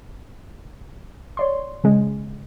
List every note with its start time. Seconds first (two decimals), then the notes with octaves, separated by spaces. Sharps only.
1.37 C#5 D5 C6
1.84 C#3 G#3